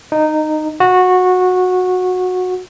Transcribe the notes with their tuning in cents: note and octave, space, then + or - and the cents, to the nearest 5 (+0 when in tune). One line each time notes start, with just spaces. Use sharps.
D#4 -15
F#4 -15